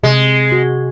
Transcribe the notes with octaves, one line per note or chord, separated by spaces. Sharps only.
C3 G#3
F#4